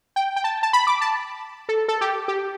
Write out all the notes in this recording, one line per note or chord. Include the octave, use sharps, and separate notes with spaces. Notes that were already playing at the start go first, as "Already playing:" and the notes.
G5
G5
A5
A5
B5
D6
A5
A4
A4
G4
G4